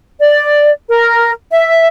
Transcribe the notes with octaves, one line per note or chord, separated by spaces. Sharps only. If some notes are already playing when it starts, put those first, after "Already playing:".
D5
A#4
E5